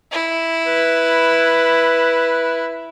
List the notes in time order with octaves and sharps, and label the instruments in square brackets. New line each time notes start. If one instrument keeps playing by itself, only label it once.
[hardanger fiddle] E4
[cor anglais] B4